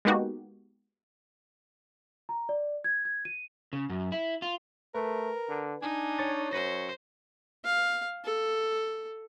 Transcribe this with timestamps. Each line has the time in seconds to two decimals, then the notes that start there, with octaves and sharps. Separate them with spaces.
0.05 G#3 A#3 B3 D#4 F#4 G4
2.29 A#5
2.49 D5
2.84 G#6
3.05 G#6
3.25 D#7
3.73 C#3
3.89 F#2
4.12 E4
4.42 F4
4.95 A3 A#4 B4
5.49 D3
5.82 D4 D#4 G#5
6.19 C#5 C#6 A6
6.53 F#2 C5 C#5 A#6
7.65 F5
8.24 A4